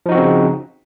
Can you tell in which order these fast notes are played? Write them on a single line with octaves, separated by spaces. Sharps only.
F3 D#4 F#4 C4 C#3